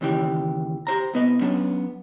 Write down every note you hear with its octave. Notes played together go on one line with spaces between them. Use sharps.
D#2 C#3 E3 G4
G4 C5 A#5
C2 B3 D#5
F#3 B3 C#4 D4